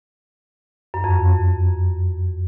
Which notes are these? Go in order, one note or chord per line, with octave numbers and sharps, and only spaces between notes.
F#2
F2